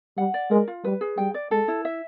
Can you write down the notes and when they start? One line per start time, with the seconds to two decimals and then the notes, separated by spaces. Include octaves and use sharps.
0.17 G3 F#5
0.34 D5
0.50 G#3 A#4
0.68 F4
0.84 G3 B4
1.01 G#4
1.18 G3 G5
1.34 D5
1.51 G#3 A4
1.68 E4
1.85 E5